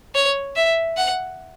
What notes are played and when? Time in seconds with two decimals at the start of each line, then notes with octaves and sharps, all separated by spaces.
0.15 C#5
0.56 E5
0.97 F#5